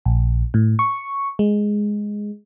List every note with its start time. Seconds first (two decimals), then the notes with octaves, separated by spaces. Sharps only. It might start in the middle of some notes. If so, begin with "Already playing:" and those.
0.06 A#1
0.54 A2
0.79 C#6
1.39 G#3